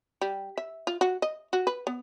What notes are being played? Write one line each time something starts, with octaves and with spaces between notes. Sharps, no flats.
G3
E5
F4
F#4
D#5
F#4
B4
B3